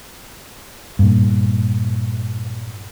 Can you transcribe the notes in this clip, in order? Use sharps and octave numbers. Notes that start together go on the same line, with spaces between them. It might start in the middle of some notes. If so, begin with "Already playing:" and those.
G2 A#2